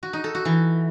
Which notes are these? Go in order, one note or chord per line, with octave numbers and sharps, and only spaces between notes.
F#4
D#4
A4
F#4
E3